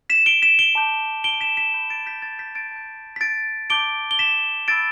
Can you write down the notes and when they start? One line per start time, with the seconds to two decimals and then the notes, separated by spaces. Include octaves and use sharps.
0.10 B6 E7
0.26 D7 G7
0.42 B6 E7
0.59 D7 G7
0.75 A5 D6 G6
1.24 D7 G7
1.41 B6 E7
1.57 B6 E7
1.74 B5 G6
1.90 A6 D7
2.06 G6 B6
2.22 A6
2.39 G6 B6
2.55 A6 D7
2.72 A5 G6
3.16 B6
3.21 A6 D7
3.70 A5 D6 G6 D7 G7
4.11 G7
4.19 B6 E7
4.68 B5 E6 G6 A6 D7